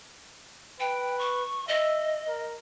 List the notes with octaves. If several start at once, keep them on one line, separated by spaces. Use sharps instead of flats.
B4 G5
C#6
D#5 E5
A#4